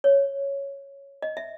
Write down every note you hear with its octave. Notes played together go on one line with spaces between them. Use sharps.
C#5
D#5
E5